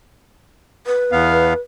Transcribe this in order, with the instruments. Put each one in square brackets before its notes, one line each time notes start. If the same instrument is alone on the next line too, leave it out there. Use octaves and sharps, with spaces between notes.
[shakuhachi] B4
[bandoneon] E2 B3 F5